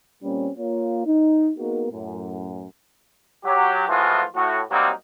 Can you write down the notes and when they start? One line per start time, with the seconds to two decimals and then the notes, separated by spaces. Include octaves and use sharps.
0.23 A#2 G3 A#3 C4 C#4
0.58 A#3 F4 C#5
1.06 D#4
1.58 A#3 B3 D#4 F#4 G#4 A#4
1.91 F#2 A2
3.45 F#3 G4
3.88 A2 E3 F3 G#3 F4 F#4
4.35 A2 F#4
4.71 F#3 G3 A#3 C4 D#4 G4